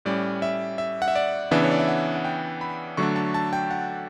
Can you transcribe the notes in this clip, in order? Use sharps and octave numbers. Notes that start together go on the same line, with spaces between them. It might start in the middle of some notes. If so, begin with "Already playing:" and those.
A2 G3 C#4 D5
E5
E5
F#5
E5
D5
C#3 E3 B3 D4 E5
C#5
D5
E5
F#5
F#5
G5
B5
D3 F#3 A3 D4 C#6
A5
A5
G5
F#5